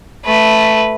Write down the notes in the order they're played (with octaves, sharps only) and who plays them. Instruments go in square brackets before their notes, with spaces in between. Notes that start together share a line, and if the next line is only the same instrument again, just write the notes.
[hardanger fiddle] A3 B4